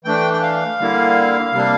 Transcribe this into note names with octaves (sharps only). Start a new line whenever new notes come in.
E3 A3 D4 G5
G5
F5
D3 G3 A#3 E4
C3 G3 A#3 D4